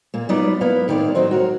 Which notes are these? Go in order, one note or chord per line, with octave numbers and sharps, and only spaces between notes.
A#2 A#3
F#3 B3 D#4 F4 B4 D5
A#3 B3 E4 B4 F5
A2 D#3 C4 B4 D5 F5
D#3 F#3 C4 D#4 C5
F#4 A#4 C#5